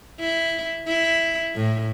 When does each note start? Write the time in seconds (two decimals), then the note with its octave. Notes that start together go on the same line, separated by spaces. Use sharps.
0.20 E4
0.87 E4
1.55 A2